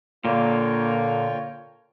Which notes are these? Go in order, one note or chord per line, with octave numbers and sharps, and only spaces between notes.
A#2 D3 A#3 F4 C#5 G5